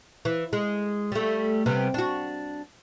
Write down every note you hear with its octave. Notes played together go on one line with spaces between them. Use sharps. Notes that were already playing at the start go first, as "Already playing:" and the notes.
E3
G#3
G3 A3
C3 G3 B3
D4 F#4